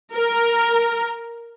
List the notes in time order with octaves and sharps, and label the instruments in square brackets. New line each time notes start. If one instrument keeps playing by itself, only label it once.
[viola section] A#4